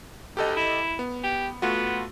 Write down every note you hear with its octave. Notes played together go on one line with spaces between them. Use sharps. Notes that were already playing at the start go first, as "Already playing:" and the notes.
D2 G4 A4 D#5
E4
B3
G4
A3 B3 F4 F#4